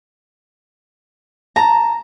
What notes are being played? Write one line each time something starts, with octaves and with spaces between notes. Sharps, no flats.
A5 A#5